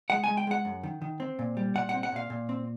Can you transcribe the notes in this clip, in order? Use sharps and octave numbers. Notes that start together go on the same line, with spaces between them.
G#3 F#5
G#3 G#5
G5
G#3 F#5
F#2
D#3
D#3
C4
A#2
G3
A#2 F#5
C4 F#5
F#5
A#2 F5
A#2
C4